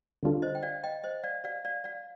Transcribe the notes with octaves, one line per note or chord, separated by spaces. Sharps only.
D3 G3 D4 F4 A4
C5 D#5
G5
D5 F5
D#5 G5
C5 D#5
D5 F5
D5 F5
D5 F5
D5 F5